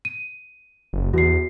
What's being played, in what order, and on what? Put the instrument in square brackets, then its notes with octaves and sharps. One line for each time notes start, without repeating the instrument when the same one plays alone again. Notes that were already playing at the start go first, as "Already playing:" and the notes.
[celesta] D#7
[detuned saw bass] F#1
[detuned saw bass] E2 [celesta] F#4 C7